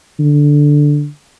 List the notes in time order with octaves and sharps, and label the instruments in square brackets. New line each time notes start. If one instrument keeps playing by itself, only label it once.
[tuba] D3